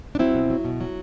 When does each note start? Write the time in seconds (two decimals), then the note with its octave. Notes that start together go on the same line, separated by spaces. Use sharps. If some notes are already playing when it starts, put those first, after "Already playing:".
0.15 D4
0.19 F#3 C4 E4
0.34 B2
0.50 F#3
0.65 B2
0.81 F#3